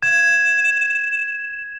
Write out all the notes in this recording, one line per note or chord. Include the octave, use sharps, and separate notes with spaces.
G#6 E7